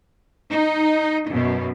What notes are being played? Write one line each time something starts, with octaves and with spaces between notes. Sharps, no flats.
D#4
F#2 B2